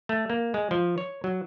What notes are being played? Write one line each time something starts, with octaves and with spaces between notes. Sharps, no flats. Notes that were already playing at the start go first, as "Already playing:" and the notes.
A3
A#3
G#3
F3
C#5
F#3